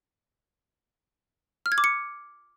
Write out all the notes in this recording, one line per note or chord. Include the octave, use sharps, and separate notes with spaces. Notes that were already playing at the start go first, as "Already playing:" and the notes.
F6
G#6
D6
C#7